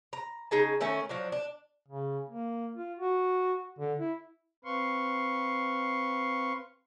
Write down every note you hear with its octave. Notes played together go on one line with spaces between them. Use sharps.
A#5
C#3 D#4 G#4 A5
D#3 A3 C#4
F3 F#3 D4
D4
C#3
A#3
F4
F#4
D3
E4
C4 B4 F5 C6 C#6